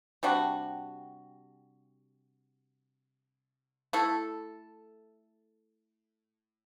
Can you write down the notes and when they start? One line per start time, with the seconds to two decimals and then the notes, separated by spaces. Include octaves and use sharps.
0.23 C3 G3 D4 F#4
3.93 A3 E4 A4